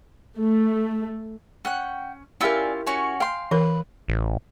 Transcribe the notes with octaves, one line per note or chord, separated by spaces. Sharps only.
A3
C#4 F#5 G5 F#6
C#4 E4 F4 G4 A#4 D5 G#5 E6
C#4 F#4 C#5 G#5
F5 G5 C6
E3 A#4 B4
A1